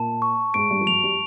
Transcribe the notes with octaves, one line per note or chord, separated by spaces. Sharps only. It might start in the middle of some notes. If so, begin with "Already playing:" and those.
Already playing: A#2 A#3 A5
C#6
G#2 G#3 D7
G2 G3
F3
F#2 F#3 F7
G3